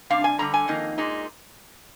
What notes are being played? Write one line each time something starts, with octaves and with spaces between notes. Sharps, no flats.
C3 G3 D4 F5
G#5
G2 D3 G3 A#5
G#5
F2 D#3 A#3 D#4
A#2 G#3 D#4